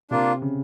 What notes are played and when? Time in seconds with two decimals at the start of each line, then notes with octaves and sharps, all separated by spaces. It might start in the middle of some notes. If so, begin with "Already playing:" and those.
0.11 C3 A#3 D4 F4
0.42 C#3